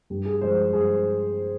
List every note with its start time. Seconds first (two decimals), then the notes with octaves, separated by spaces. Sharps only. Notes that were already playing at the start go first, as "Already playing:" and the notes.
0.10 G2 G4
0.25 G#4
0.41 F3 G#3 C5
0.72 G2 G#4